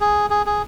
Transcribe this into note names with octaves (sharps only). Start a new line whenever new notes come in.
G#4
G#4
G#4